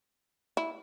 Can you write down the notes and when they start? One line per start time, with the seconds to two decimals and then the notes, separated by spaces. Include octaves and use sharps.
0.57 E4